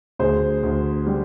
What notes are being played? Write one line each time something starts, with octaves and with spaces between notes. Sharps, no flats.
D2 G#4 C5
D2
G3